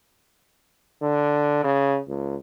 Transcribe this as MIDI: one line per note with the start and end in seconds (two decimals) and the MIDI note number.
1.02 1.63 50
1.64 1.99 49
2.08 2.36 37